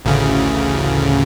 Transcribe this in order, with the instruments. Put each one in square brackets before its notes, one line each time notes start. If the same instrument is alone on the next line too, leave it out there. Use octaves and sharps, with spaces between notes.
[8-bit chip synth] A1 D2 C#3